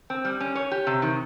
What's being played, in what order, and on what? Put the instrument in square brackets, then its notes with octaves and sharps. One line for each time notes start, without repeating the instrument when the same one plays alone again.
[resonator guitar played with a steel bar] C4
G3
C#4
C#5
G4
C3
D#3